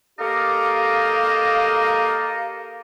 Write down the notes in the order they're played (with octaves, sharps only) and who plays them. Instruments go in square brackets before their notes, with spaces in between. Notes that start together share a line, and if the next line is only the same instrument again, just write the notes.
[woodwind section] A#3 G4 A4 A#4 D#5 F5